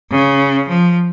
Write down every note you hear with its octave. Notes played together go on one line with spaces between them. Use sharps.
C#3
F3